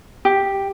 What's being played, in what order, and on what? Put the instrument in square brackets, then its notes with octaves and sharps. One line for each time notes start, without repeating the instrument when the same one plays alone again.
[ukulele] G4